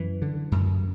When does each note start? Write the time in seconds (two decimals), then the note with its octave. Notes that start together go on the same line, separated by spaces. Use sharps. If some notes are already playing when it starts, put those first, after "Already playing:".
Already playing: F#2 E3
0.22 D3
0.52 F#2